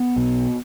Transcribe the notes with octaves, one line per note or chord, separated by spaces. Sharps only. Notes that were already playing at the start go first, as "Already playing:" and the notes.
Already playing: B3
B1 B2